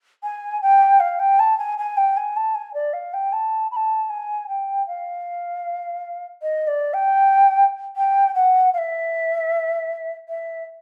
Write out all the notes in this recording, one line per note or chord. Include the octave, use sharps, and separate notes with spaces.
G#5
G5
F5
G5
A5
G#5
G#5
G5
G#5
A5
G#5
D5
F5
G5
A5
B5
A5
G#5
G5
F5
D#5
D5
G5
G5
F#5
F5
E5
E5